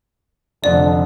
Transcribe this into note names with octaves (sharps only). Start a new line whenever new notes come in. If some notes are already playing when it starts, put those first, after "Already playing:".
F1 F2 D3 D5